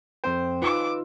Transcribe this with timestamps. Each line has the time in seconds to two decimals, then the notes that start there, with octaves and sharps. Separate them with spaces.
0.24 F2 C4 C5 G5
0.62 D#4 F4 B4 D6 E6